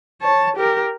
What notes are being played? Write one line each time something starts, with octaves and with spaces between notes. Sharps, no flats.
C#5 A5
G4 A#4